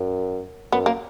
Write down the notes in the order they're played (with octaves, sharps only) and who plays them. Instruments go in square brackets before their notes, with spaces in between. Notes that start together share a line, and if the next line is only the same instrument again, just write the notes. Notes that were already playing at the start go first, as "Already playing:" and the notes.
Already playing: [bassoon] F#2
[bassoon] F#2 [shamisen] B3
[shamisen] A#3